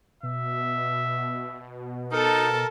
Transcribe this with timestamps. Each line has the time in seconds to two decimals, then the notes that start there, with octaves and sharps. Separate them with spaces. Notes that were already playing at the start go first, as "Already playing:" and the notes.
0.23 B2 E5
2.12 D#4 A4 A#4 A5